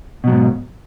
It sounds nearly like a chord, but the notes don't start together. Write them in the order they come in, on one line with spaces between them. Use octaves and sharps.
B2 F#3 G#2